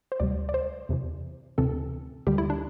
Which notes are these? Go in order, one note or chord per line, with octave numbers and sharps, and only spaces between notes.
C5
D2 C3 G3 D5
D5
C5
E2 C3 E3
D2 C3 E3 C4 A4
D2 D3 G3 G4
E4
D4